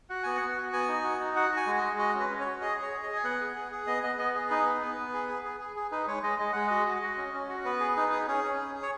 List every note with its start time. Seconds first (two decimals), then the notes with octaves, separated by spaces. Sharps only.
0.10 F#4 F#5
0.23 B3 G#5
0.37 B3 F#5
0.57 F#4
0.73 B3 G#5
0.88 D#4
1.04 F#4
1.20 D#4
1.36 F#4 F#5
1.51 F#4
1.57 G#5
1.67 G#3
1.78 D#5
1.83 G#3
1.99 F#4 D#5
2.14 C#4 B4
2.30 C#4
2.40 C#5
2.46 F#4
2.61 G#4 D#5
2.78 G#4 C#5
2.93 G#4
3.03 D#5
3.09 G#4
3.16 G#5
3.24 B3 F#5
3.40 G#4
3.56 G#4
3.71 G#4
3.87 B3 D#5
4.03 B3 D#5
4.18 B3 D#5
4.35 G#4
4.50 D#4 B4
4.66 B3
4.82 B3
4.98 B3
5.13 G#4
5.29 G#4
5.44 G#4
5.60 G#4
5.76 G#4
5.92 D#4 B4
6.08 G#3 C#5
6.23 G#3 D#5
6.39 G#3 D#5
6.53 G#3 F#5
6.67 F#4 D#5
6.86 F#4
7.02 F#4
7.17 C#4
7.33 C#4
7.49 F#4
7.65 B3 B4
7.80 G#4
7.96 D#4 B4
8.12 G#4
8.28 C#4 G#4
8.44 C#4
8.59 G#4
8.75 G#4
8.83 C#5